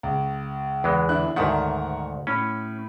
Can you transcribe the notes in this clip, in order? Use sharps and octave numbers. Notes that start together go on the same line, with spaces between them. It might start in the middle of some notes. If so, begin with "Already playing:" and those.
C#2
E2 E3 G#3
D3 E4 F#6
D2 G#2 D#3 A#4 E5 F#5
A2 C#4 B5